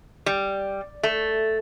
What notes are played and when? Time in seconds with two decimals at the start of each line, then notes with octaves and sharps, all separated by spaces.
0.26 G3
1.03 A3